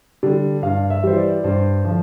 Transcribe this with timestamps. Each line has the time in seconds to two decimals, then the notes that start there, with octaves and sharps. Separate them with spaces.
0.23 D3 G3
0.63 G2 F5
0.90 E5
1.04 E3 G3 C5
1.17 D5
1.44 G2 C5
1.85 D3 F3